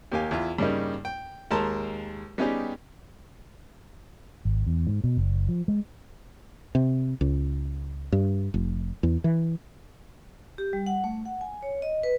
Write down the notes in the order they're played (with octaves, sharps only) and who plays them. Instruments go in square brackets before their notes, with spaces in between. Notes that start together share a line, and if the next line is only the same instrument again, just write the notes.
[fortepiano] D#2 A#3 G4 F5 G#5
E2 E4 F4
G2 C#3 G3 A#3 D#4
G5
D#2 G#3 A#4 A5 A#5 C6
G3 B3 C#4 D#4 G4 G#4
[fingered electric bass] G#1
E2
G#2
B2
F#1
F3
G#3
[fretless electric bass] C3
C#2
G2
F1
E2
E3
[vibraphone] G4
G3
F#5
A3
F#5
G#5
C#5
D#5
B4